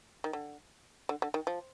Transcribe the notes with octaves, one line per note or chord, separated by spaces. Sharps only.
D#3
D3
D3
D3
D#3
F3